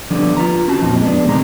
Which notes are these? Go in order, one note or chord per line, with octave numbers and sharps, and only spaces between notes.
D3 F3 G3 B3 D4
F4 B4 A#5
C#4 F#4 A5
F2 A#2 F3 D#4
G#3 B3 D4
A2 C3 D#3 G#3 A#5